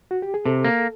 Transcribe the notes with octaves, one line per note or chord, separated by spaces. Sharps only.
F#4
G4
G#4
C3 A4
A#3